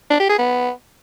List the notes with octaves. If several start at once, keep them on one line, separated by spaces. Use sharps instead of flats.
D4
G4
G#4
B3